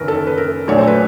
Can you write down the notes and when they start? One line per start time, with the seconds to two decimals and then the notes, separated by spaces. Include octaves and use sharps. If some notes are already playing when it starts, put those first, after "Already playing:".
Already playing: F#1 F#2 D#3 A#4 B4
0.08 A4
0.27 B4
0.38 A#4
0.68 A#1 A#2 F#3 A3 C#5
0.78 C5
0.88 B4